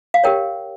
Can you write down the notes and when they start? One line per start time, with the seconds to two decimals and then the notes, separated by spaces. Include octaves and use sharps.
0.14 F5
0.24 G4 A#4 C#5 G5